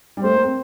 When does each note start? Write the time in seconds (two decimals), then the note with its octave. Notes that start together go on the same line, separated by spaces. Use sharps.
0.17 G3
0.23 A3 C5
0.33 A#3
0.44 C4